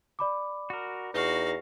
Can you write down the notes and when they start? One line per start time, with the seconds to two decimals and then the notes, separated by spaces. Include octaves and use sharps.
0.19 D5 B5 D6
0.70 F#4 A#4
1.14 E2 D#4 F#4 F5